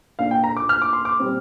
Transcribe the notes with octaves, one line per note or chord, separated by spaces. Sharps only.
A#2 A#3 D4 F5
G5
A#5
D6
F6
D6
C6
D6
A#2 G3 C4